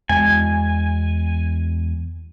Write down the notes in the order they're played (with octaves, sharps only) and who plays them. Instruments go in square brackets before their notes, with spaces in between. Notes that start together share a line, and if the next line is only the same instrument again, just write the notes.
[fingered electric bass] E2 G#3 [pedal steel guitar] G#5